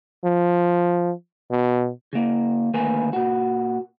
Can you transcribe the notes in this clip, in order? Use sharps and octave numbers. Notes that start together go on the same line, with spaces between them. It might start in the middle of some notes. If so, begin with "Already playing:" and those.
F3
B2
C#3 A#3
D2 D#3 A#3 A#4 B4 G#5
A#2 F#4